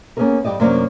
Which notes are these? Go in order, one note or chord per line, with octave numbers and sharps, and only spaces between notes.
A#3 B3 C#4 D#4 G#4 A#4
G2 C#3 G4 D5 D#5
F#2 C3 F#3 A#3 D4 D5